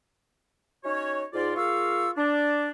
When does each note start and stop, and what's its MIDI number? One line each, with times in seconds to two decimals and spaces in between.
0.84 1.23 61
0.84 1.23 63
0.84 1.23 66
0.84 1.23 73
1.33 1.53 44
1.33 1.53 65
1.33 1.53 74
1.56 2.10 58
1.56 2.10 65
1.56 2.10 68
1.56 2.10 77
1.56 2.10 85
1.56 2.10 88
2.16 2.69 62